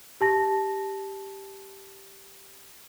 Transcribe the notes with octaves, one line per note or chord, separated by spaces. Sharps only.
G4 A5 A#6